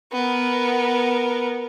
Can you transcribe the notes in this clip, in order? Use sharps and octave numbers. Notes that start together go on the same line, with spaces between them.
B3 A#4